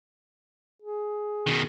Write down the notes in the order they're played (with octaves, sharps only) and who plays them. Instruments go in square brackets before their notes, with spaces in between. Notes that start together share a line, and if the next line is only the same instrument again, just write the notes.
[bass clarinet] G#4
[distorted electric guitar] B2 D#3